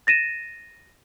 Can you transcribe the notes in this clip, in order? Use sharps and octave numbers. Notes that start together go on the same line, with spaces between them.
A6 A#6 D#7 E7